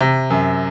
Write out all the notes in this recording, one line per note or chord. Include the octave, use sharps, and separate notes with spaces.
C3
F#2